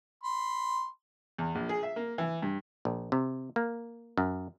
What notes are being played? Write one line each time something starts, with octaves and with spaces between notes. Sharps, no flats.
B5 C6
E2
A#1
G#4
E5
A#3
E3
G2
A#1
C3
A#3
F#2